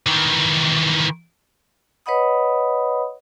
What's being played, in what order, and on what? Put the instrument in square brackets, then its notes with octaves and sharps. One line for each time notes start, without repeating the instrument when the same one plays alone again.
[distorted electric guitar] D#3 E3
[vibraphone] B4 C#5 D#5 F#5 B5 D#6